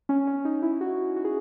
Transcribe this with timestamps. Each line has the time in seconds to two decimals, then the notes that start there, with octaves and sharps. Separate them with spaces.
0.09 C#4
0.27 C#4
0.45 D#4
0.62 E4
0.81 F#4
1.16 F#4
1.24 G#4